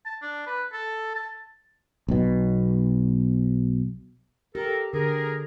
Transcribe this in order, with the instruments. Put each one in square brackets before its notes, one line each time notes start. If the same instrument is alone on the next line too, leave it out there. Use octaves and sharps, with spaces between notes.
[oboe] A5
D4
B4
A4
A5
[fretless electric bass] B1 B2
[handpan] G4 [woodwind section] A4 A#4
[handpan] D3 [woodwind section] G#4 A#4